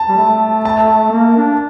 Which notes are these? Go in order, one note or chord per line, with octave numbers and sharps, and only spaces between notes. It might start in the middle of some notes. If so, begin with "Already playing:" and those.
Already playing: A5
G3
A3
A5
A#3
D4